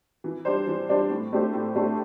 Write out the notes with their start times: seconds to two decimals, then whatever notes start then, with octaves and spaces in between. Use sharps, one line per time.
0.24 E3
0.45 G3 D4 C5
0.67 E3
0.89 G3 D4 C5
1.10 A2
1.32 A3 D4 G4 C5
1.53 A2
1.76 A3 D4 G4 C5